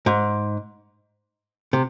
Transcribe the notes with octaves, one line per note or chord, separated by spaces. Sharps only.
G#2
C3